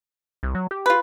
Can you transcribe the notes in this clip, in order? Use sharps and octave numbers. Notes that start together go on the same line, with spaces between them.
C2
F#3
G4
F4 B4